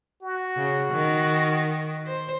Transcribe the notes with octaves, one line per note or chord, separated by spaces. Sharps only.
F#4
C#3
D#3
C5